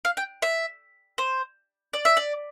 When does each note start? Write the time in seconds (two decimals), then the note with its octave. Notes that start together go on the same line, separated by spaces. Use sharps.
0.05 F5
0.17 G5
0.42 E5
1.18 C5
1.93 D5
2.05 E5
2.17 D5